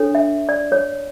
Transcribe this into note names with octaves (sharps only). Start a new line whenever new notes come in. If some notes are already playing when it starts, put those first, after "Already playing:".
Already playing: D4 A4 C#5
E5
D5
C#5